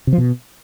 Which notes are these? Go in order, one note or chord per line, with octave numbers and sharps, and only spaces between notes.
C3
F3
B2